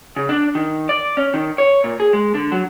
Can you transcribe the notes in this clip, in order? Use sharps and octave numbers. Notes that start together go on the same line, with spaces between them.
C#3
D4
D#3
D5
C#4
D#3
C#5
A#2
G#4
G#3
D3
F#3